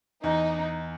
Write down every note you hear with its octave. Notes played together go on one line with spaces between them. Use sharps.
E2 D#4